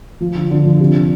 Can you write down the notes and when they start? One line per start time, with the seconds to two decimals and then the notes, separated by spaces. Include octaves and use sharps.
0.20 F3
0.35 D3
0.51 D3
0.65 F3
0.80 C3
0.95 D4